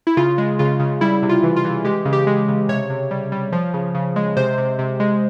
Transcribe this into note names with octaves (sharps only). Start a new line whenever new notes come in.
E4
C#3 F4
G#3
C#3 F4
C#3
G3 E4
C3
F4
E3
F4
E3
G#3 G4
C#3
G4
G#3
C#3
C3 C#5
C3
G3
G3
F3
C#3
C#3
G#3
C3 C5
C3
C3
G#3